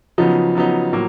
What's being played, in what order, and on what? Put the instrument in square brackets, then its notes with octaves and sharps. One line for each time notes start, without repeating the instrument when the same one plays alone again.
[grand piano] C#3 F#3 B3 D#4 [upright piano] F3
[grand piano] C#3 F#3 B3 D#4
A2 F#3 A#3